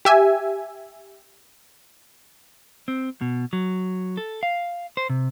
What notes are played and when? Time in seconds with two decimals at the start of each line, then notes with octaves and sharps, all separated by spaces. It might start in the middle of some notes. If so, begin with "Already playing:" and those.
0.05 G4 E5 G#5
2.88 C4
3.21 B2
3.53 F#3
4.17 A4
4.43 F5
4.97 C5
5.10 C3